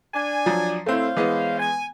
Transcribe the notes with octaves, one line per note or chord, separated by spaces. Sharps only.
D4 G#5
F3 F#3
A3 C4 E4 C5 C#5 F5
E3 G#3 B3
G#5